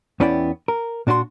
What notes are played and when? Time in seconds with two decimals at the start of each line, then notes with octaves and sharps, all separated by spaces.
0.20 E2 B3 C#4 E4 D5 G5
0.68 A#4
1.07 A#2 D4 F#4 B4 C6